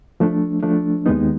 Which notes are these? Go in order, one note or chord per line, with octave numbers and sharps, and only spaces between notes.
F3 A3 D4
F3 A3 D4
D#2 D#3 G#3 B3 D#4